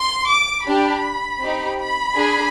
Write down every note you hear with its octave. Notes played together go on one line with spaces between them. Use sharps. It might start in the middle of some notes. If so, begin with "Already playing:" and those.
Already playing: C6
D6
D4 G4 B5
C4 D#4 G4
B5
D4 G#4